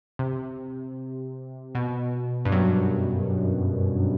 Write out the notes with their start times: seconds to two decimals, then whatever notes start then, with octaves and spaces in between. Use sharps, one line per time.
0.19 C3
1.75 B2
2.45 G2
2.52 F#2